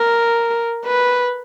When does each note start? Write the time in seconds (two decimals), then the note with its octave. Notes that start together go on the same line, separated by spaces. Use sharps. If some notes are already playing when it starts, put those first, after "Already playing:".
Already playing: A#4
0.85 B4